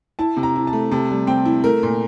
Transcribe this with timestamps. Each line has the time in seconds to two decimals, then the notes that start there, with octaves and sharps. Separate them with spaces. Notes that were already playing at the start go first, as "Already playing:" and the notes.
0.19 E4 A5
0.37 C3
0.43 A#5
0.56 E4
0.67 A5
0.73 A3
0.92 C3 A5
1.10 G3
1.27 C4 G5
1.45 E4
1.64 A3 A#4
1.83 A#2